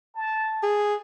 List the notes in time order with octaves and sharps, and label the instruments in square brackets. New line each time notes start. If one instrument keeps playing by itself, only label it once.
[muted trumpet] A5
[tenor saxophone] G#4